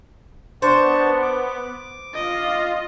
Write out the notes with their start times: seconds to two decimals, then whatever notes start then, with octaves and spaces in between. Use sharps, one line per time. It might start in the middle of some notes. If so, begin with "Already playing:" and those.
0.62 B3 D4 C5 A5 C#6
1.22 D6
2.14 F4 D#5